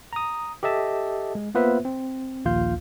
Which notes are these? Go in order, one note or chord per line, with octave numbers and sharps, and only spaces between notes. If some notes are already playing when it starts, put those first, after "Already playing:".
A#5 D#6
G4 A4 D#5 E5 A5
G#3
A#3 B3 F4 B4 C5 E5
C4
A#1 D#2 F4 F5 G6